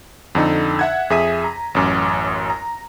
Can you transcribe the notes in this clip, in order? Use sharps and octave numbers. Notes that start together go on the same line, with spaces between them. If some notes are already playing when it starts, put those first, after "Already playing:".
F2 D3 D#4 A4
E5 F#5 G#6
F2 G#4 E5 B6 D#7
A#5
A1 F#2 D6
A#5